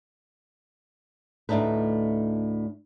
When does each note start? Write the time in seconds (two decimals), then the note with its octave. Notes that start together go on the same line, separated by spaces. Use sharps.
1.49 D2 A2 A3 D4 D#4 B4